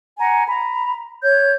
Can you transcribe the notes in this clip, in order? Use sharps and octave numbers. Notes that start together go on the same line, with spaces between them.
F#5 G#5 A#5
A#5 B5
C#5 G6